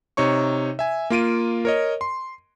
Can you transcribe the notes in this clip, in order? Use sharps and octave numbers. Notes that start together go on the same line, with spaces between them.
C3 D#4 C#5 C#6
E5 G#5
A#3 F4 D7 D#7
A#4 C#5 D#5
C6